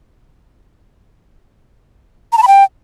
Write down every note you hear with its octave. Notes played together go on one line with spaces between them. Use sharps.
A#5
A5
B5
G5